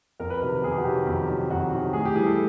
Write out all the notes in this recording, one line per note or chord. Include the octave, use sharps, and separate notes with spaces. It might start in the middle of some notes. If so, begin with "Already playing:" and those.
F2 A#4
B4
C3 D#3 F#3 A#4
F2 G#4
G4
F#4
C3 D#3 F#3 G4
F2
C3 D#3 F#3
F2 F#4
C3 D#3 F#3
A2 G#4
G4
E3 G3 G#4
A4